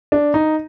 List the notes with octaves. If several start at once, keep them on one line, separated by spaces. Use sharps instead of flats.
D4
D#4